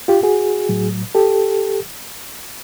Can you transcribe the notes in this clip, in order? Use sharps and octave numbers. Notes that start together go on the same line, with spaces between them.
F4 G4
F#4 G#4
A2 F#3
G4 A4